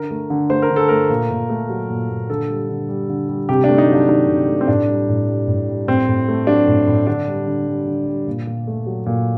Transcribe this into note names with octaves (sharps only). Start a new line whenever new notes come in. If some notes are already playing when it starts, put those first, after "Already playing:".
Already playing: D3 A#4
A3
D3
A3 C5
A#4
D3
A4
A3 A#4
A#2
A#2
A3
F#3
A#2
A#2
D3 A4
G3
D3
G3
D3
G3
C3 G4
D4
A3
D#4
F#3
D4
D#3 D#4
C3
A3
C4
A2 D4
G3
A2
G3
A2
G3
A2 C4
A2
A3
F#3 D4
A2
A2
D3 D4
G3
D3
G3
D3
G3
A#2
A#2
A3
F#3
A#2